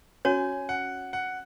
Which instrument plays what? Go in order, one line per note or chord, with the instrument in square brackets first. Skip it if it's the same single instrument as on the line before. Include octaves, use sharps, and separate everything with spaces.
[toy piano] C#4 F#4 C#5 [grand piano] G#5
[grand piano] F#5
F#5